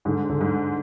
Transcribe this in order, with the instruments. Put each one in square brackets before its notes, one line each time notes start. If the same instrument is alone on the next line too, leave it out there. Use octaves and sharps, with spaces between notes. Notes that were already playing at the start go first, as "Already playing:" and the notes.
[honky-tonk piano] G#2 [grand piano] D3
[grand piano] D3
[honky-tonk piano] G#2